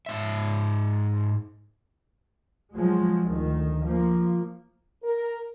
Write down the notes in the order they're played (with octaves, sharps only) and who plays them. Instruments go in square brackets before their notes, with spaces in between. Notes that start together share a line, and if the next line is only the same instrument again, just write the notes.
[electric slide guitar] G#2 E5
[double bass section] F3 F#3 G#3
D2 D#3
F3 A#3
[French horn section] A#4